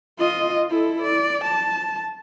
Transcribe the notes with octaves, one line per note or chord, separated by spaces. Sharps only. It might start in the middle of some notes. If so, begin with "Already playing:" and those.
F4 D#5
E4 A4
D5
A5